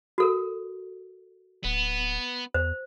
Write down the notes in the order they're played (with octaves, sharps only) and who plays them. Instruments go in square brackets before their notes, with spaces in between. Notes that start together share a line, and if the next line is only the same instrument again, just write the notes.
[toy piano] F#4 A4 A#4
[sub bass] D1 [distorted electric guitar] B3
[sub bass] E2 [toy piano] C5